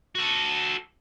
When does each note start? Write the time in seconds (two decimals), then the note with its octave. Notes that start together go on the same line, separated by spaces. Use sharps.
0.15 F#4 A4